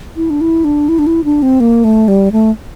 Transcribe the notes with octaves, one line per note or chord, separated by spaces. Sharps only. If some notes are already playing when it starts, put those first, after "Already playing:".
E4
D4
E4
D4
E4
D4
E4
D4
C4
A#3
A3
G3
A3